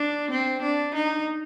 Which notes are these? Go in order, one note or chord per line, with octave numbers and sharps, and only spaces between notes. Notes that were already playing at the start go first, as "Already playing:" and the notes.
Already playing: D4
C4
D4
D#4